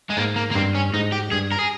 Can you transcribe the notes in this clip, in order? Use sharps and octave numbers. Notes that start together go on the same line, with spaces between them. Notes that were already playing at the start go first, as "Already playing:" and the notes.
G#3
G#2 A#3
A#3
A#3
G2 C4
C#4
G#2 D#4
G4
G2 G#4
A#4
G#4